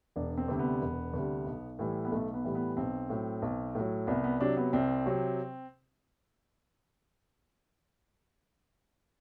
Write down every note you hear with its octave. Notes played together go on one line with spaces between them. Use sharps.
E1 D4
C4
D2 C3 G3
B3
E1
D2 C3 G3
B1
A2 E3 G3
B3
B1 A3
B3
A2 E3 G3
B3
B1 C4
A2 F#3
B1
A2 F#3
C2 B3
B3
C3 F#3 D4
B3
C2 C4
C3 F#3